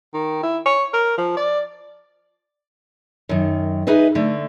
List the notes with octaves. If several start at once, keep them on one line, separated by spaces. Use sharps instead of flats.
D#3
E4
C#5
A#4
F3
D5
F#2 D#3
D#4 G#4 B4 D#5 E5
D3 A3